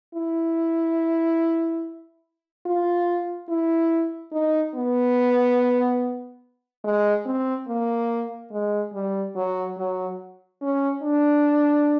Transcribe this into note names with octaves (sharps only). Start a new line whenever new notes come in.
E4
F4
E4
D#4
B3
G#3
C4
A#3
G#3
G3
F#3
F#3
C#4
D4